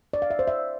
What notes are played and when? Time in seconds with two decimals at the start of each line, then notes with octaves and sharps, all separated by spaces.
0.13 D5
0.22 F5
0.31 E5
0.39 C5
0.48 E5